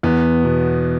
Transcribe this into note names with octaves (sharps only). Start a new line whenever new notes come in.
E2 B3
B2